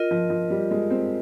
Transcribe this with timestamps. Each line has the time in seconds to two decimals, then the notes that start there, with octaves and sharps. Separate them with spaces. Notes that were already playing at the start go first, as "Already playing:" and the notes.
Already playing: F4 A#4 D#5
0.11 F3
0.30 F3
0.50 G3
0.71 G#3
0.90 C4